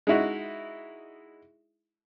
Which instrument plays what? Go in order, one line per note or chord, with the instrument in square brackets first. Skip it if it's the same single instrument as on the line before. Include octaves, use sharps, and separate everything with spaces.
[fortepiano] G#3 D#4 E4 F#4